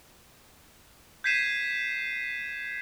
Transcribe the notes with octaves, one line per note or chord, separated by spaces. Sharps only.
G6 G#6 B6 C7 D#7 E7